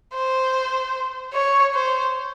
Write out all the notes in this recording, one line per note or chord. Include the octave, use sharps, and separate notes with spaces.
C5
C#5
C5